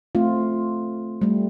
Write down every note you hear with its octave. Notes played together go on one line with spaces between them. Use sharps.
A3 C4 F4
G3 A3